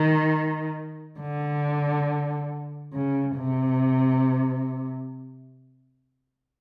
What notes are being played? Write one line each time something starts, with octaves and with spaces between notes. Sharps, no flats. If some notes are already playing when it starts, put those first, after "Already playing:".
Already playing: D#3
D3
C#3
C3